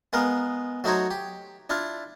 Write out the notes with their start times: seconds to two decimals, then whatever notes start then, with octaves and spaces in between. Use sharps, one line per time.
0.13 G#3 B3 A#4 F5
0.84 F#3 A3 D#4 F#4 C5 C#5
1.11 G4
1.70 D4 E4 F4 F5